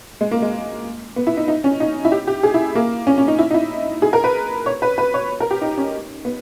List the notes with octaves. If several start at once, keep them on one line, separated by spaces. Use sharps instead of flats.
G#3
A#3
G#3
B3
E4
D#4
D#4
C#4
D#4
E4
G4
G4
G#4
E4
A#3
C#4
C#4
D#4
E4
D#4
E4
G#4
A#4
B4
C#5
B4
B4
C#5
A#4
G4
D#4
C#4
B3